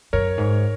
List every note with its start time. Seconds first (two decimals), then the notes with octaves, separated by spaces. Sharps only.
0.13 F#2 A#4 C#5
0.38 G#2